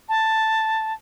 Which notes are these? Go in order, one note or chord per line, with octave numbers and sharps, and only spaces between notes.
A5